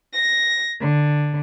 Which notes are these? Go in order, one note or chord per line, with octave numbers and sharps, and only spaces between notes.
A#6
D3